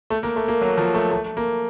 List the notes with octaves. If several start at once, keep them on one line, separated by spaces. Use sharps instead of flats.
A3
A#3
A3
A#3
F#3
F3
A3
A3
A#3